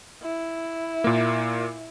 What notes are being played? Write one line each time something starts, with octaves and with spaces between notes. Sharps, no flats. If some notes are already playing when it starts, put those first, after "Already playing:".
E4
A#2 A#3